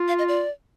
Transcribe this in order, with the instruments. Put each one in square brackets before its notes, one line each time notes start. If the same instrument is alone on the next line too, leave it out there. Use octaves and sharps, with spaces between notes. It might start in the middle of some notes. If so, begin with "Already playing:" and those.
Already playing: [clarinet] F4
[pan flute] F5
D#5
D5